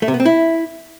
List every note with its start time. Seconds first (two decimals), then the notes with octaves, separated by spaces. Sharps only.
0.02 A3
0.08 C3
0.14 B3
0.20 C4
0.25 E4